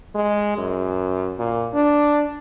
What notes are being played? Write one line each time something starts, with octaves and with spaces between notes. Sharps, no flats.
G#3
F#2
A#2
D4